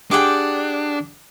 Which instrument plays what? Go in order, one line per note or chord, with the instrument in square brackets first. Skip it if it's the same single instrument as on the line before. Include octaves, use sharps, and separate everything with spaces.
[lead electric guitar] D4 [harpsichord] G4 G#4 F#5 [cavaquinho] G5 D6